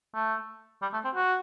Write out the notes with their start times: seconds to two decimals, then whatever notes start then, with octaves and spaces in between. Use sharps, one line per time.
0.14 A3
0.82 G3
0.93 A3
1.04 C4
1.15 F#4